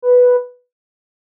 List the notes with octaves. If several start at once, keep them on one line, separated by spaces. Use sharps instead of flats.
B4